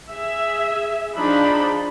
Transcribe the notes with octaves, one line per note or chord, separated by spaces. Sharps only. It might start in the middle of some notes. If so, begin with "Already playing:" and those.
G#4 E5
F3 D4 D#4 G#4 B5